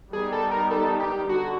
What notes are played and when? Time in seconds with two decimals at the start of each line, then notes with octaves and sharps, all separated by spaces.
0.13 D#3 G3 B3 D#4 G#4
0.32 A4
0.51 A#4
0.71 A4
1.00 G4
1.29 D3 F#4